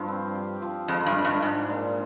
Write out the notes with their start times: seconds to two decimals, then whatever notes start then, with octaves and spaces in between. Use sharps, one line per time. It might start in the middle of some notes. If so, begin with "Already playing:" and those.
Already playing: G2 F3
0.08 C4
0.35 G4
0.62 F3
0.88 F2 G#3
1.06 G2
1.15 D4
1.24 G2
1.42 G#2 D4
1.70 A#2